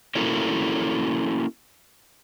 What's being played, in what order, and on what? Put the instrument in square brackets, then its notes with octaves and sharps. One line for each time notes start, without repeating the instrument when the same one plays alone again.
[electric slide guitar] A#3 C#4 E4 F#4 A4 A#4